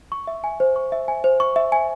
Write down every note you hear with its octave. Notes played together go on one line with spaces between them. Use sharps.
C#6
E5
G#5
C5
C#6
E5
G#5
C5
C#6
E5
G#5